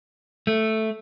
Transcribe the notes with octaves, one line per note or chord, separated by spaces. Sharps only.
A3